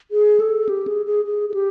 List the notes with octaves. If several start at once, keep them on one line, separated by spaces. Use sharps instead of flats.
G#4
A4
G4
G#4
G#4
G#4
G#4
G4